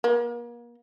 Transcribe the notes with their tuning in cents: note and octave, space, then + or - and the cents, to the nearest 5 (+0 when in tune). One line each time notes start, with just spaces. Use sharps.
A#3 +35